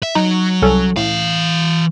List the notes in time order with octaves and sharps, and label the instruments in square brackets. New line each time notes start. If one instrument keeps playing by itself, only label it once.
[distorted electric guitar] E5
[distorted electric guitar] F#3 [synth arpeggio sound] D#4
[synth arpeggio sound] C2 C#4 A4
[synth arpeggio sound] A2 [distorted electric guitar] E3 F5